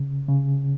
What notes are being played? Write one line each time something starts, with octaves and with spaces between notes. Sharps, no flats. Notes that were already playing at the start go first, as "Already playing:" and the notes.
Already playing: C#3
C#3